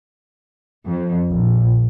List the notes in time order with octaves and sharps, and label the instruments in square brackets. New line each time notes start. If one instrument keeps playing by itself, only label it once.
[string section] F2
A#1